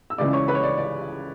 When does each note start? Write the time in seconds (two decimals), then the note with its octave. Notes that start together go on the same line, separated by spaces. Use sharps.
0.10 E6
0.18 C#2 C#3 E3 G#3 D5 D6
0.33 C#5 C#6
0.48 B4 B5
0.55 C#5
0.63 D5
0.78 D5